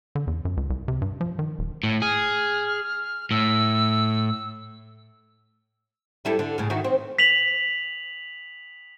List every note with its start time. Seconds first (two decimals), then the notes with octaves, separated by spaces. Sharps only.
0.15 D3
0.27 E2
0.45 F#2
0.57 C#2
0.70 C2
0.88 C3
1.02 G2
1.21 F3
1.39 D#3
1.59 D#1
1.84 A2
2.02 G#4 F6
3.31 A2 E6
6.25 G3 E4 A4
6.39 D3
6.58 A2 C#3
6.70 D#3 E4 F#4
6.84 C4
7.19 B6 F7 F#7